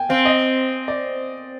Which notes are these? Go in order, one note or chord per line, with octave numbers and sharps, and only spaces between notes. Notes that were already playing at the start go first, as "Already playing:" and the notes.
Already playing: G5 G#5
C4 F5
D#5
D5